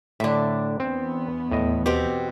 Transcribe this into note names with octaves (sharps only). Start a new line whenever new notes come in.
A2 D3 D4 E5
E2 B3 C4
D#2 A2 D#5
B2 C4 G4